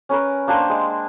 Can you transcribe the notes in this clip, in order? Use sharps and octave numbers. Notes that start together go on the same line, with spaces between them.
C#4 A#4 B4
A#3 D4 G4 C5
G#3